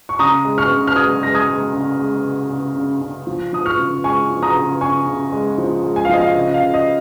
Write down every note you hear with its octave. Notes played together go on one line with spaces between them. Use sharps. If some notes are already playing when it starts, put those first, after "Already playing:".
C#6
C#3 A#5 D#6
G#3
C#6 F6
C#3
F6
G#3 D#6 G#6
G#3 A#6
D#6 G#6
G#3
C#3
G#3
C#3
C#3
C#3
C#3
F3
F3 D#6
C#6 F6
C#3
G#3 G#5 C#6
F3
A#5 D#6
C#3
C#3 G#5 C#6
C#3
G#3
F3
G#3
G#5
F5
F3 D#5
F5
C#3 D#5
F5
C#3
D#5